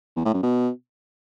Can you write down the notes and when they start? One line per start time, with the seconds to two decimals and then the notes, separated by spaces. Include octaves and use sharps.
0.16 E2
0.25 A2
0.34 F#2
0.43 B2